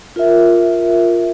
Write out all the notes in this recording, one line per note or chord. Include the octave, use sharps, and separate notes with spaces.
F4 A#4 E5